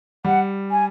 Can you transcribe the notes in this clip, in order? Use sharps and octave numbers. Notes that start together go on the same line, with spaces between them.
G3 F#5
G#5